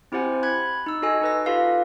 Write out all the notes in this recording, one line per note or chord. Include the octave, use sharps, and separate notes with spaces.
C4 E4 G4 C5 F#5 G#5
B5 F#6 G#6
D#4 E6
F#4 A4 D#5 G#5 E6
D#4 B4 A#6
F4 G4 A4 B4 F5